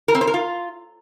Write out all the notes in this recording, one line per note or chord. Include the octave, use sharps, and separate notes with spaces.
A#4
C4
C5
A#4
F4